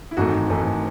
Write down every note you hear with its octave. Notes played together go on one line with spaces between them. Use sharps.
E4
G#1 G#2 E3 A3 D#4 F#4
G#1 G#2 E3 A3